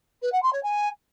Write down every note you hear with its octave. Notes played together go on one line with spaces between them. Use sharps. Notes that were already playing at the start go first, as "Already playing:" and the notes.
B4
F#5
C6
C#5
G#5